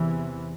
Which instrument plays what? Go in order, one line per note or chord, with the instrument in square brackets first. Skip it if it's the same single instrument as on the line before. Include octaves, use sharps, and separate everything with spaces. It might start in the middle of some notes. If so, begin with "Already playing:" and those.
Already playing: [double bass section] E2 C3 E3